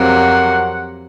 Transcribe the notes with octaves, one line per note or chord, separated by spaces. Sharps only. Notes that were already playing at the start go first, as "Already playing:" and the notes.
Already playing: F2 C3 F#3 A#3 F#5